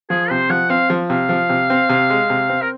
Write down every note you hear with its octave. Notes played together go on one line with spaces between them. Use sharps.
F3 G#4
C3 C5
F3 F#5
C4 F5
F3
C3 F5
F3
C3
C4
C3
G#3
C3
C4
A#4